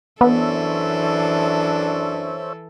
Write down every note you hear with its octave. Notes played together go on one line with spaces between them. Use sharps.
F#2 E3 B3 D4 A4 C5 C#5 E5